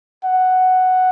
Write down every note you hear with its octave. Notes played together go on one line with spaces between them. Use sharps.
F#5